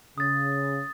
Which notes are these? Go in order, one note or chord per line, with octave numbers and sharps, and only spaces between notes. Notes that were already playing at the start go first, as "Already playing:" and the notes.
C#3 D#6 A6